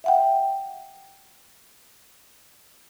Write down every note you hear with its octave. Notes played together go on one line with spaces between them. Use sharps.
E5 F#5 G5